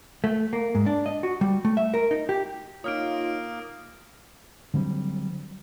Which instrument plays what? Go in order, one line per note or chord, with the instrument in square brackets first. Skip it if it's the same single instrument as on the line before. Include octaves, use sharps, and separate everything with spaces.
[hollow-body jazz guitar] A3
A#3
G#2
D4
D#5
F#4
G3
A3
E5
A#4
D#4
G4
[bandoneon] A#3 [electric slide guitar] D#4 C#5 [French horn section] F4 [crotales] D#6 F6 D7
[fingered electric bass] D3 F#3 G3 C4